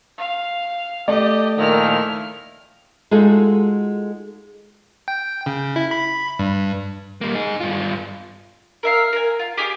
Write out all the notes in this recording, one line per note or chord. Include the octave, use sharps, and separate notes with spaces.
F5
A3 G4 D5 D#5
A#2 D#3 F3 E4 F6
G#3 D#4 F4 F#4 G#4 A4
G5
C#3
E4
B5
G2
G3 A#3
D#4 G#4
G2 F4
A#4 E5 F5
A#4 G#5
F4
G4 G#4 D6